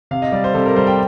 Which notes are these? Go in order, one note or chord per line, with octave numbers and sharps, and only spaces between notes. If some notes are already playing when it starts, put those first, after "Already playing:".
C3 F5
D#5
G3 D5
C5
C3 A4
A#4
G3 C5
G5